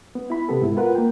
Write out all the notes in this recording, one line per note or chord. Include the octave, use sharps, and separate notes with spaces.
B3
E4 B5
C3 B3 G4 A4
G#2 E4
F4 A#4 B4 F#5
A#3 G5